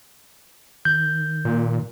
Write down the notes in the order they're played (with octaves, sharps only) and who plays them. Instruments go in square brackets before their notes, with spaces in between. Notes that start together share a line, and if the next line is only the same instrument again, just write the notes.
[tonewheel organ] D#3 [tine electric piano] G6
[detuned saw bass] A#2